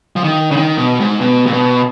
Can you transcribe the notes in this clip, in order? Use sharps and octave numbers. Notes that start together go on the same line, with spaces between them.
F3
D#3
C#3
D#3
B2
G#2
B2
A#2
B2